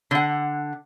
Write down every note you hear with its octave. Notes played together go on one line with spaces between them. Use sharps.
D3 F#5